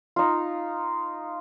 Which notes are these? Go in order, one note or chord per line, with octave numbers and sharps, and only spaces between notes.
D#4 F4